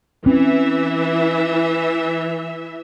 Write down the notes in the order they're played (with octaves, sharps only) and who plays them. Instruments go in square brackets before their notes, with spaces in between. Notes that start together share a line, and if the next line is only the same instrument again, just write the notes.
[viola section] E3 E5 [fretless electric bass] C4 C#4